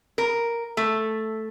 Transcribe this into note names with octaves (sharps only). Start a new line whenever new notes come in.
A#4
A3